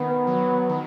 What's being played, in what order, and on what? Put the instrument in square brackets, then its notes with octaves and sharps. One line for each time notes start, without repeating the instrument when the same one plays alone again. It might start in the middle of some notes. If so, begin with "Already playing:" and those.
Already playing: [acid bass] D#3 [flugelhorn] B3
[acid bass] F#3
D#3